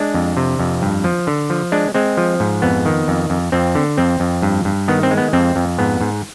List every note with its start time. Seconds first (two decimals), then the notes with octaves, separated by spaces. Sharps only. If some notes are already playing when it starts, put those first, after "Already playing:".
Already playing: G#3 D4
0.14 F2
0.37 C3
0.59 F2
0.82 G2
1.04 F3
1.27 D3
1.50 F3
1.72 G#3 D4
1.94 G#3 C4
2.17 F3
2.40 G#2
2.62 F2 B3
2.86 D#3
3.08 F2
3.30 F2
3.52 F2 C4
3.75 D3
3.97 F2 C4
4.20 F2
4.42 G2
4.65 G2
4.88 D#3 B3
5.03 C4
5.11 G#3
5.18 B3
5.33 F2 C4
5.56 F2
5.78 G#2 B3
6.01 G#2